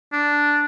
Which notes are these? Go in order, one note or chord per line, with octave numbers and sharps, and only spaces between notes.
D4